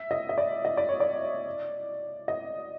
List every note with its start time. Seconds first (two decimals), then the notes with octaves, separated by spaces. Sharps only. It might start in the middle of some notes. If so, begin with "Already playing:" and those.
Already playing: E5
0.11 D#5
0.29 D#5
0.38 D5
0.65 D#5
0.77 D5
0.89 C#5
1.00 D5
2.28 D#5